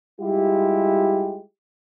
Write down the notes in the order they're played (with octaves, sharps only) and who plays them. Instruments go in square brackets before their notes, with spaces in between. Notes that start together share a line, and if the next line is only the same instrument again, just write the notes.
[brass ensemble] G3 G#3 E4 F4 G4